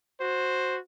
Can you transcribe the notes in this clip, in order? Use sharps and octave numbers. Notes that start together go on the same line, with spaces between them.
F#4 C5